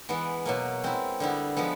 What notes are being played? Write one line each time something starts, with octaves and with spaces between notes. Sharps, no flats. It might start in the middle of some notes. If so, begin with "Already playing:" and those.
E3 G#3 B3
B2 F#3 A#3
G#3 C4 E4
D3 G3 B3 E4
F3 G#3 B3